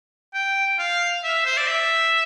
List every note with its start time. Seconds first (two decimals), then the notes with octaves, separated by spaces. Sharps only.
0.34 G5
0.79 F5
1.24 E5
1.46 C5
1.57 D5
1.68 E5